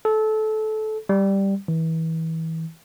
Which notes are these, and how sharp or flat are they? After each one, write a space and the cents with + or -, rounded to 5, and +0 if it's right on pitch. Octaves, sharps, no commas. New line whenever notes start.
A4 -20
G3 +0
E3 -30